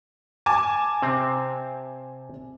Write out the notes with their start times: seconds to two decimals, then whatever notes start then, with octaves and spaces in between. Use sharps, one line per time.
0.46 G#5 A5 D6
1.02 C3 C4